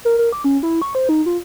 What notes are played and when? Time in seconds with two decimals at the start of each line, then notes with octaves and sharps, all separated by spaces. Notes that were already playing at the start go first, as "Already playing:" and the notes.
0.05 A#4
0.18 A#4
0.32 D6
0.44 C#4
0.63 E4
0.82 C#6
0.95 C5
1.09 D#4
1.26 F4